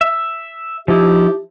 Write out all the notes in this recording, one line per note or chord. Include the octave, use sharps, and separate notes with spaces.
E5
F3 D#4 E4 G4